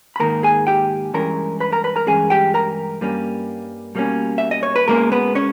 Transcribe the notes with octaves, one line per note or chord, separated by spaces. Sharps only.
B5
G#2 D#3 A#3 A#4 A#5
G#4 G#5
G4 G5
G2 E3 G#3 C#4 A#4 A#5
B4 B5
A#4 A#5
B4 B5
A#4 A#5
G2 E3 G#3 C#4 G#4 G#5
G4 G5
A#4 A#5
G2 G3 A#3 C#4
B2 G3 A#3 C#4
E5
D#5
C#5
B4
B2 G#3 A#3 C#4 A#4
B3 B4
C#4 C#5